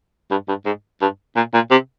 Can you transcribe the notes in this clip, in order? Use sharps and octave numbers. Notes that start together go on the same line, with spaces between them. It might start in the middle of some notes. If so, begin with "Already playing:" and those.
G2
G2
G#2
G2
A#2
A#2
C3